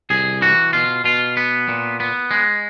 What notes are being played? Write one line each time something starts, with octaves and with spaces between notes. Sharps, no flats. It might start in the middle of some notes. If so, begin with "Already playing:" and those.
C2 G#4
E3 F#4
B2 F4
B2 F4
B3
A#2
B3
G#3